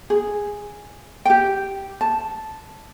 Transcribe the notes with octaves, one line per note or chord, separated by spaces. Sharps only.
G#4
G4 G5
A5